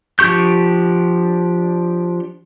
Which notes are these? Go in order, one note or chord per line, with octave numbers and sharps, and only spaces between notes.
F3 D4 G4 C#6 G6